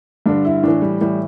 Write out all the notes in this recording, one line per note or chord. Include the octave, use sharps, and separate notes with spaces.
G2 D3 D4
E4
A2 E3 D4
G3
A2 E3 G3